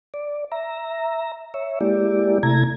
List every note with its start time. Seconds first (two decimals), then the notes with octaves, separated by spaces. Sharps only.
0.14 D5
0.52 E5 A#5
1.54 C#5 E5
1.81 G#3 A#3 E4 G4 D5
2.43 C3 A3 E4 A#5 G#6